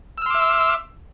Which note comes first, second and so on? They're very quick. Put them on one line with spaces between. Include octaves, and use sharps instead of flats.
E6 F6 C6 D6 E5